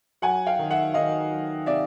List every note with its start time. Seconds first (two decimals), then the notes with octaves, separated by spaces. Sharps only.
0.22 F#3 F#5 G#5
0.46 F5 G5
0.59 D#3
0.71 E5 F#5
0.94 D#3 D#5 F5
1.30 F#3
1.66 C3 D5 E5